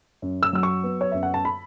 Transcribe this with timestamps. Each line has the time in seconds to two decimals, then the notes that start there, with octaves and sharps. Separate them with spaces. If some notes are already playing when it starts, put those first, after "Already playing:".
0.22 F#2
0.43 E6
0.53 F#3 E6
0.63 C#6
0.83 B3
1.01 C#5
1.12 F#2 E5
1.23 F#5
1.34 A5
1.45 B5